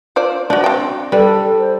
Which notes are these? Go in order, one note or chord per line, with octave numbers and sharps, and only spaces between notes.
F4 C5 D5
F3 D4 F#4
C4 G5
G3 A4 B4
C5